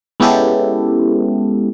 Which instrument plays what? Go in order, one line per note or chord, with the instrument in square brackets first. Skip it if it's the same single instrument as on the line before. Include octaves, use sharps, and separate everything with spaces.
[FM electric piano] G#3 B3 C#4 E4 G4 A4